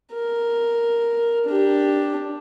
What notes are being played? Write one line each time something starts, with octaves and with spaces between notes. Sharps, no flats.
A#4
D4 G4